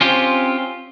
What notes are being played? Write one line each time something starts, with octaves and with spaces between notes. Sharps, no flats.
C4 C#4 F4 G4